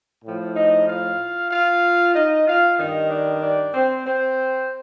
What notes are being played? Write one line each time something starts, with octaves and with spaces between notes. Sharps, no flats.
A2 F3
D#4 D#5
F4 F5
F4 F5
D#4 D#5
F4 F5
G2 D#3 D#4 D#5
D4 D5
D4 D5
C4 C5
C4 C5